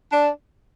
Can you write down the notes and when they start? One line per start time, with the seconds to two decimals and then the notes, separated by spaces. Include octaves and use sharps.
0.12 D4